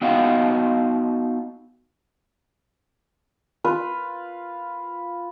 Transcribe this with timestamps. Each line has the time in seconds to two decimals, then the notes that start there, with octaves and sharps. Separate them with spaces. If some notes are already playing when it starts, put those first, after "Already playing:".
0.02 B3 D#4 F#4 D#5 F5 G5
3.64 F4 B4